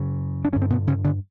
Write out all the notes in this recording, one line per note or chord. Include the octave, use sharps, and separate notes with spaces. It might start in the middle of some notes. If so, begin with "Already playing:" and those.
Already playing: F#2 C#3
D4
G2 D3 C#4
C4
B2 B3
C#3 C#4
D3 D4